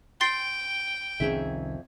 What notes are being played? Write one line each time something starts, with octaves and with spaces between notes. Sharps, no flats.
G5 C6 A6 C7
C2 F2 D#3 C#4 G#4 E5